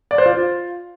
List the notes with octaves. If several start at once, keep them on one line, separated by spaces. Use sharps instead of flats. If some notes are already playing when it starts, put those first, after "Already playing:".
D5
C5
F4